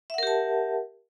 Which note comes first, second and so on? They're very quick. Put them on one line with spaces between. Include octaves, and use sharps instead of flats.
E5 F#5 A#4 G4 A5